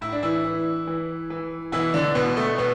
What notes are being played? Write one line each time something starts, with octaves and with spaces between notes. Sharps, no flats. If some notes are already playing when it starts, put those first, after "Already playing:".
A2 E4
D4
E3 E4
E3
E3
E3
B2 E3 E4
D3 D4
B2 B3
A3
B2 B3